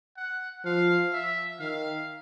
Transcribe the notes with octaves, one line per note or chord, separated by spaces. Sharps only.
F#5
F3 F5
E5
D#3 F5